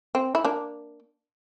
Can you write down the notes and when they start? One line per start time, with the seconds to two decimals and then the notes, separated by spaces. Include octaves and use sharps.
0.15 C4
0.35 E4
0.44 A#3 D4